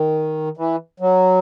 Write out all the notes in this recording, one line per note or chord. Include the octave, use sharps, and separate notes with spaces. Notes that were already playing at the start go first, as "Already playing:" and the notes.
Already playing: D#3
E3
F#3